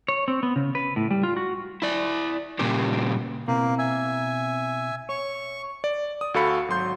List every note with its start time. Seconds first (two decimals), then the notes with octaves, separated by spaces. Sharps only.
0.08 C#5
0.28 C4
0.43 B3
0.56 C#3
0.75 B4
0.96 A2
1.11 G3
1.23 F4
1.37 F#4
1.82 E4 D5
2.59 A#2 C#3 G3 A#3 G4
3.48 B2 A#3 C4 E4
3.78 E5 G#5
5.09 C#5 C#6
5.84 D5
6.21 D#6
6.34 D2 F#4 A4 F5 B5 C#7
6.68 G#1 F#3 C6 G6